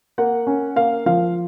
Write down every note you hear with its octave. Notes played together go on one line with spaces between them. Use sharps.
A#3 F#5
C#4
A#3 F5
F3 F5